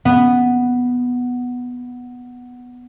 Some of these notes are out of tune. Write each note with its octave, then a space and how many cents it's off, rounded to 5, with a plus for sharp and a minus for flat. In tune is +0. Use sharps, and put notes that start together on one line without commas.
B3 +0